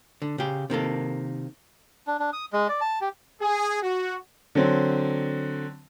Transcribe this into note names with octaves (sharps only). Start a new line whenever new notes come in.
D3
C#3 G4
C3 D#3 A#3 A4
D4
D4
D#6
G#3
D5
A5
G4
G#4
F#4
D3 F#3 C4